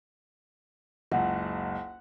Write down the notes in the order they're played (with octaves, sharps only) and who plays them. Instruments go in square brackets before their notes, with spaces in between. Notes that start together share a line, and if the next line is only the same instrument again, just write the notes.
[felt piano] F#1 C#2 [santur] F#5